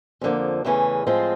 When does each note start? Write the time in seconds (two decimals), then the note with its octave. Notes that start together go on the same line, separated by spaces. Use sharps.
0.21 F2 D3 F3 A#3
0.65 E2 C#3 E3 A3 C#4
1.07 A2 F3 G#3 C4 F4